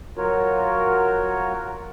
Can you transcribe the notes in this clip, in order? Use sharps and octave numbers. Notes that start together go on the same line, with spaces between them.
F#3 F4 F#4 A#4 C#5